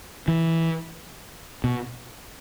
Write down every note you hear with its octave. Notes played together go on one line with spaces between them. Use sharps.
E3
B2